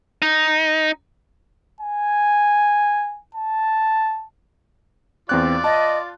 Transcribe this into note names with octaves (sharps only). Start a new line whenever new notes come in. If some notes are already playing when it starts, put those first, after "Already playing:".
D#4
G#5
A5
E2 C4 F4 D5 F#6
D#5 A5